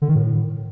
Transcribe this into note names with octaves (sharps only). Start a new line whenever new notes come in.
D3
D#3
A2